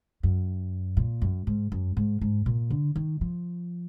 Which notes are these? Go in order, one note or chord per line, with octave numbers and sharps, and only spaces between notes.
F#2
A#2
F#2
G#2
F#2
G#2
G#2
A#2
D3
D#3
F3